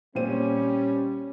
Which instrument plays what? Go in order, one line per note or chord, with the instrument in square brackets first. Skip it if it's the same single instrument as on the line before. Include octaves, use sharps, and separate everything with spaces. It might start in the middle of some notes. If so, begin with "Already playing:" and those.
[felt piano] A#2 C4 D#7 [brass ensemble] G3 C#4